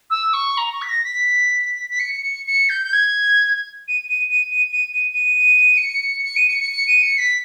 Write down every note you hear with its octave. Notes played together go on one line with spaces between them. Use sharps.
E6
C#6
A#5
C#6
B6
A#6
B6
B6
C#7
C#7
C#7
G6
G6
G#6
D#7
D#7
D#7
D#7
D#7
D#7
D#7
C#7
C#7
D#7
C#7
C#7
C#7
D#7
C#7
B6